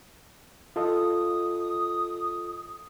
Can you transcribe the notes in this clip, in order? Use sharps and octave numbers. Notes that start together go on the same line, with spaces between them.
F4 A4 D#5 D#6